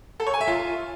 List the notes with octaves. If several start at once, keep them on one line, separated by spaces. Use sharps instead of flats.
A4
C#5
G#5
E5
F4